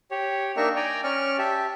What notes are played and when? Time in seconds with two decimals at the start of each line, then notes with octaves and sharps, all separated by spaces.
0.11 G4 C#5
0.57 A#3 D4 D#4 A#4 E5 C#6
0.76 D5 G5 G#5 A#5
1.04 C#4 D5 C#6 F6
1.38 G4 E5 A5